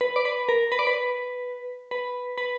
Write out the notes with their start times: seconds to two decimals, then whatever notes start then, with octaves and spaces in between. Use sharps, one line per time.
0.01 B4
0.16 D5
0.25 B4
0.49 A#4
0.72 B4
0.79 D5
0.87 B4
1.91 B4
2.38 B4